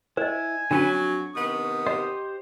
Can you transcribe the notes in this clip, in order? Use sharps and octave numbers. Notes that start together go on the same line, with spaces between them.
E4 C5 D#5 G#5
F2 D3 F#3 C#4 D4 B4
C#6
C3 D#3 B3 D#6
G4 C5 D#5